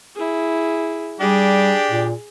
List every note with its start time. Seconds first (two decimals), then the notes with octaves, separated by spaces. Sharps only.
0.15 E4 G#4
1.20 G3 D4 G4 G#4
1.90 A#2